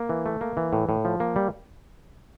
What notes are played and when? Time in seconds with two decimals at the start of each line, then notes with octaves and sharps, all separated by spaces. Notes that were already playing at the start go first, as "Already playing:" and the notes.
Already playing: A#3
0.09 E3
0.26 A3
0.41 A#3
0.57 E3
0.73 A2
0.89 A2
1.05 F3
1.20 A#3
1.36 G3